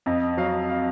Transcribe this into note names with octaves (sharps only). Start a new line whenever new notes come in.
F2 D#5
F#3 F5
F5